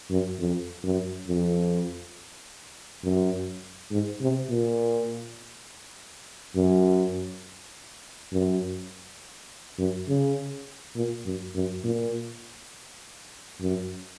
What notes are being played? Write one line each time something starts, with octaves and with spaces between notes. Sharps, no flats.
F#2
F2
F#2
F2
F#2
G#2
C3
A#2
F#2
F#2
F#2
C#3
A#2
F#2
F#2
A#2
F#2